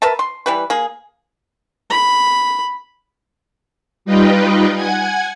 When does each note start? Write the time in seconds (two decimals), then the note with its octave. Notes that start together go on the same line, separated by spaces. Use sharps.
0.02 A#4 B4 E5 A5
0.19 C6
0.46 E3 G3 B4
0.70 A#3 G#4
1.90 B5
4.05 G3 D#4 F4 B4 D#5 G5
4.75 F#5 G#5 G#6